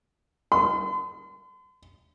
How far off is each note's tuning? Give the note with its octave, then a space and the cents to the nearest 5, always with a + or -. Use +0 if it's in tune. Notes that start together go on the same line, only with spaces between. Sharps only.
C6 -45